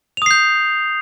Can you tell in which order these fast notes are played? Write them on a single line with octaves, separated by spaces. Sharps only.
F7 D#6 C7 G6